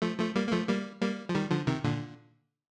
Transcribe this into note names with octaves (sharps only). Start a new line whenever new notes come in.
F3 A3
F3 A3
G3 A#3
A#3
F3 A3
G3 A#3
G3 A#3
F3
D#3 G3
D3 F3
C3 D#3
A#2 D3